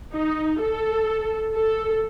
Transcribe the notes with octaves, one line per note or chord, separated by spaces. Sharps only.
D#4
A4
A4